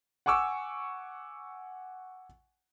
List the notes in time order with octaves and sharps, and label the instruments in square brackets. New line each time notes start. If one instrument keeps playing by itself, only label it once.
[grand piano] F#5 G#5 C#6 D6 E6